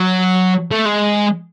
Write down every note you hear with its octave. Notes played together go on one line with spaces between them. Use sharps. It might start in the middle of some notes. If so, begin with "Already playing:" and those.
Already playing: F#3
A3
G#3